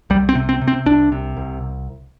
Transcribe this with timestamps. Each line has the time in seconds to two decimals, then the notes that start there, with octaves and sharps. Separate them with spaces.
0.10 C2 G3
0.29 C4
0.35 C3
0.49 C4
0.61 C3
0.68 C4
0.86 C2 D4
1.12 C3
1.37 C2